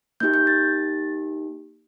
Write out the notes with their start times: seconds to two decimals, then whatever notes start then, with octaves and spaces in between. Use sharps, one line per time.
0.20 A#3 D#4 G4 G6
0.34 G6
0.47 A6